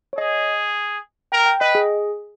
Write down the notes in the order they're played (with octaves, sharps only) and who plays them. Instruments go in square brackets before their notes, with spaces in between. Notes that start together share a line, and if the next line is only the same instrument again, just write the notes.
[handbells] C#5
[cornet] G#4 [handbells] D#5
[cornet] A#4 [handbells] G5
[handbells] G5
[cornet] B4 [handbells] D#5
[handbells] G#4